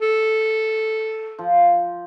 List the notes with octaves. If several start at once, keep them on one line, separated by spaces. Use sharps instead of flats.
A4
F3